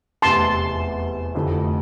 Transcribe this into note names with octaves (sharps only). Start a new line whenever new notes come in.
F1 E2 C3 A5 C6
F1 F2 D3 A3 E4